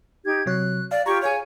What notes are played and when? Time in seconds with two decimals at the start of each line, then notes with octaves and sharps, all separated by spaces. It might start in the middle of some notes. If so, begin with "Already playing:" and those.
0.25 D#4 G4 G#6
0.46 C3 F#3 C#5 F#6
0.91 D5 F5
1.06 F4 G4 A#5 C#6 G#6
1.22 G#4 C#5 F5 G#5 F6